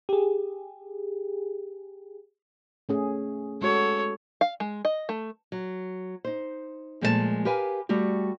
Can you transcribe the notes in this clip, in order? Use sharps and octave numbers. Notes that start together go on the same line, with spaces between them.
G4 G#4
A3 C#4 G#4
G#3 F#4 A4 C#5
F5
G#3
D#5
A3
F#3
D#4 C5
A#2 F3 G#3 A3 A#4 A5
G4 A#4 B4 F5 G#5
G3 A3 F#4 G4